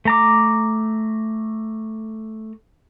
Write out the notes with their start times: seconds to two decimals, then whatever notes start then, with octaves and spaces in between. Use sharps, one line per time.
0.05 A3 A#5 D6